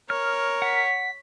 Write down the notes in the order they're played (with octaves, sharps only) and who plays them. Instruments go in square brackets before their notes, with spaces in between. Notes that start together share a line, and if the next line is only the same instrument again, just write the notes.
[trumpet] A#4 [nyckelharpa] C#5 [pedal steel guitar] F6
[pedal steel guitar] F#5 [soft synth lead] B6